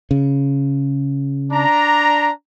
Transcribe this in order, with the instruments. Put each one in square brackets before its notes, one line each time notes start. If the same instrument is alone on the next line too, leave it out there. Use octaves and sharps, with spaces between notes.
[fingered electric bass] C#3
[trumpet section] D4 A#5